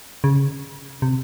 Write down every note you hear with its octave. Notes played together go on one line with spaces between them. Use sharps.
C#3
C3